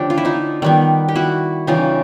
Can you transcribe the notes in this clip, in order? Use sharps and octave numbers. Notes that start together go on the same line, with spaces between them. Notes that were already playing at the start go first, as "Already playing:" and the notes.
Already playing: D3 F3 A3 C#4 D4 G4
F4
E4
D#4 F4
D#3 G3 B3
G4
E4 F#4
C#3 E3 G3 D#4 F4